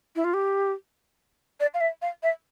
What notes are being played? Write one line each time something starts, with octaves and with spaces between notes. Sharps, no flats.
E4
F4
G4
D5
F5
E5
F5
E5